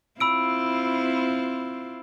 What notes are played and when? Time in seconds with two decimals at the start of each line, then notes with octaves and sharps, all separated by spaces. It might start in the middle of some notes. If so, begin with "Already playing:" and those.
0.20 C4 E4 F4 B5 E6 D7